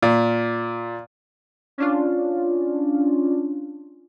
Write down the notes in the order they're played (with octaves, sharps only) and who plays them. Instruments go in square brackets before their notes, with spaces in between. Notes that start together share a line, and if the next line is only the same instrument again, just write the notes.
[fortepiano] A#2
[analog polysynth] C#4 D4 F4